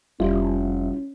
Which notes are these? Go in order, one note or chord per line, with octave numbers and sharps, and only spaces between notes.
F1 G3 C#4 E4 F4